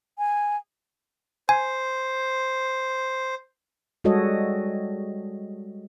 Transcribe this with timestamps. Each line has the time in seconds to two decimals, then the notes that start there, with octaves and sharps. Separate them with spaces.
0.18 G#5
1.49 C5 G#5
4.04 G3 G#3 F#4 A4 C#5 D#5